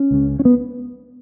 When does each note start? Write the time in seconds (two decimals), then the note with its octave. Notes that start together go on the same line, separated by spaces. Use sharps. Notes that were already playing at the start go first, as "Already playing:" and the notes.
Already playing: C#4
0.11 C#2 C#3
0.39 C#4
0.45 B3